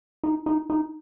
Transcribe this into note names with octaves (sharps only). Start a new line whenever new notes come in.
D#4
D#4
D#4